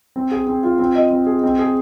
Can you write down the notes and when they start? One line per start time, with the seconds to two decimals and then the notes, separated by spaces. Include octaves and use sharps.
0.16 C4
0.31 G#4
0.47 C4
0.63 F4
0.79 C4
0.95 D#5
1.11 C4
1.26 G#4
1.43 C4
1.59 G#4